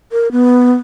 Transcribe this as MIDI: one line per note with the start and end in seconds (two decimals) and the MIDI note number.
0.12 0.31 70
0.32 0.74 59